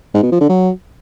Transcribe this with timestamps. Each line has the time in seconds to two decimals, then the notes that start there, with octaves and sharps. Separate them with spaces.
0.14 G#2
0.23 B2
0.32 F3
0.40 D3
0.49 F#3